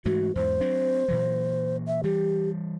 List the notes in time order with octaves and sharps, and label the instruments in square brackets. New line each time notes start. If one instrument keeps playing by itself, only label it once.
[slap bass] G#2 E3 A3 [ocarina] F#4
[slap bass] E2 G#2 [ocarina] C5
[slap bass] F#3 C4 D4
A#2 E3 F#3
[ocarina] E5
[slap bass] E3 G3 [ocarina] G4